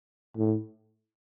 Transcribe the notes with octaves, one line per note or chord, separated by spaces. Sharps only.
A2